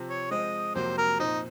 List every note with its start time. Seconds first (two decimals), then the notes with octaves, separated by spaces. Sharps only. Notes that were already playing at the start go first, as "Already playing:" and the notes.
Already playing: C3 F3 C4
0.09 C#5
0.31 F3 G#3 C4 D#5
0.75 F2 C3 F#3 A#3 C5
0.98 A#4
1.20 A#2 F3 C4 D#4